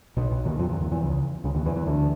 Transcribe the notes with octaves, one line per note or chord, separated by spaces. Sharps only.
B1 B2
B1 B2
D#2 D#3
F2 F3
E2 E3
D#2 D#3
E2 E3
C#2 C#3
C#2 C#3
D#2 D#3
E2 E3
E2 E3
D2 D3